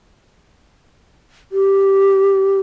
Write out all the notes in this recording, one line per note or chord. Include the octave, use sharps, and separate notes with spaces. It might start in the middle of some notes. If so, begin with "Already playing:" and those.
G4